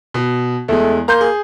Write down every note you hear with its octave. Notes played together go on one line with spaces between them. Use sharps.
B2
E2 G#3 A3
A#3 A#5 C6 G6
G#4